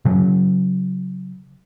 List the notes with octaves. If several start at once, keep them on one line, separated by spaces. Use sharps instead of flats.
C#3 F#3